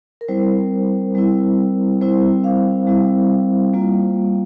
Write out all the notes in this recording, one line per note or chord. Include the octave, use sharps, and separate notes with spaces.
A#4
G3 C4 E4 C5
G3 C4 E4
G3 C4 E4 C5
F5
G3 C4 E4
G3 A#3 F4